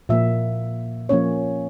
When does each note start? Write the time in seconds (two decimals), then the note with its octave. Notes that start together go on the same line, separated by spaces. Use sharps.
0.09 A#2 F3 A#3 E5
1.09 F3 A#3 C#4 C#5